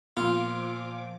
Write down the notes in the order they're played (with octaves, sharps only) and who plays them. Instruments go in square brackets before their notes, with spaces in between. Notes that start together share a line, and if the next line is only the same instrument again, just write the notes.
[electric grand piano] A#2 [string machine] F3 D6 [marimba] B3 [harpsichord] F4